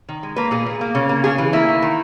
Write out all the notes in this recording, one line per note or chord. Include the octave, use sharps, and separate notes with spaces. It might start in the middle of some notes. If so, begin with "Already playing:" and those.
D#3
G#3
A#3 B4
A#2 G#4
A#2
A#3
C#3
A#3
C#3 G#4
E3
A#3 E4
D#3
D#3